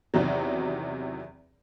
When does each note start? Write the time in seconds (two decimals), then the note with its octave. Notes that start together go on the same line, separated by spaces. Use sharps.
0.14 E2 C3 D#3 F#3